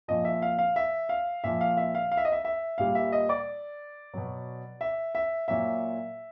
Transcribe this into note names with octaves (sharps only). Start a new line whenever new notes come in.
A#2 F3 D#5
E5
F5
F5
E5
F5
A#2 F3 E5
F5
E5
F5
F5
E5
D#5
E5
E5
A#2 G3 F5
E5
D#5
D5
B2 F#3
E5
E5
A#2 F#3 E5